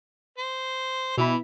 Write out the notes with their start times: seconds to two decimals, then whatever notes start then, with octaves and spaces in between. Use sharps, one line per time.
0.38 C5
1.18 B2 E3 E4 B5